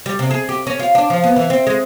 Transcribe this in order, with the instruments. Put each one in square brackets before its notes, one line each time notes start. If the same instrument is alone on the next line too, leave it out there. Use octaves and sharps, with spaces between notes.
[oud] G3
C3
G#4
G4
C#4
F4
D4
F3
B3
E3
C4
G#3